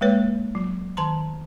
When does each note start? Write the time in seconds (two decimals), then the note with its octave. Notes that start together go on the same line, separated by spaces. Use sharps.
0.01 G#3 A#3 B4 C#5
0.55 F#3
0.97 D#3 A5 A#5 C6